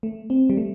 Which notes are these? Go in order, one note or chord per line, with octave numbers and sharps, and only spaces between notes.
A3
C4
G3
A3